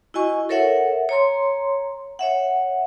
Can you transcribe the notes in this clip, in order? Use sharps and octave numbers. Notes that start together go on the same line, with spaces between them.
E4 F#4 D#5 G#5 C#6
A4 A#4 C#5 E5 F#5
C#5 A#5 C6
C#5 E5 F#5